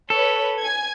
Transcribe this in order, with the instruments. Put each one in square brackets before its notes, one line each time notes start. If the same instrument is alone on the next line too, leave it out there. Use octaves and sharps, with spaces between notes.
[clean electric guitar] A4 [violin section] B4 C#5
[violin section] G#5 G#6